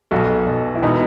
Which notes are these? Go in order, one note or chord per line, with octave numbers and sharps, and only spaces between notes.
B1 B2 F#4 A4
B1 B2
E4
E1 B2 B3 D#4